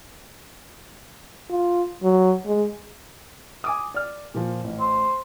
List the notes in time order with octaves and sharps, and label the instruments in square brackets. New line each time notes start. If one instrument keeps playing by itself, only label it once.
[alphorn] F4
F#3
G#3
[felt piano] G#5 D6 D#6
D5 F6
A#2 F3
A1
[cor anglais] C5